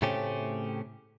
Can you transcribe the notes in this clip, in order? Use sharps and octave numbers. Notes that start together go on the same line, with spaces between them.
A2 C#3 A3 C4 C#4 G4